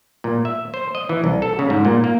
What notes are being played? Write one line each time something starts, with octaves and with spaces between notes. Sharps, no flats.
A#2
E5
C5
D#5
E3
C2
A4
C#3
G#2
A#2
A#3